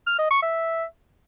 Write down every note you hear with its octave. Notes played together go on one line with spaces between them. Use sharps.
F6
D#5
C#6
E5